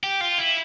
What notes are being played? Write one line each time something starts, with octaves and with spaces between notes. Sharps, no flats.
G4
F4
E4